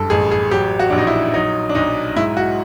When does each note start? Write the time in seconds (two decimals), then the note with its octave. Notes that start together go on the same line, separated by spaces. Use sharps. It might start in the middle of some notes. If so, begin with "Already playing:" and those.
Already playing: F#1 G2 A4
0.10 A1 G#4
0.31 G#4
0.51 F#3 G4
0.79 F#4
0.90 A#1 D4
0.98 D#4
1.07 E4
1.33 F#3 D#4
1.69 D4
1.75 B1 D#4
2.17 G#2 E4
2.37 F#4